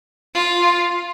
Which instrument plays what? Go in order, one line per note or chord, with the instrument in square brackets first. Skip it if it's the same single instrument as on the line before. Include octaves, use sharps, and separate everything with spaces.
[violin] F4